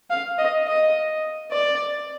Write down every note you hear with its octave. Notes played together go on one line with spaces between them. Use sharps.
F5
D#5
D#5
D5